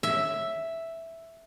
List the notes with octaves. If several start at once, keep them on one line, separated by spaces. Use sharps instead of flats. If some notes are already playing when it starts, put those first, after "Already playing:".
E5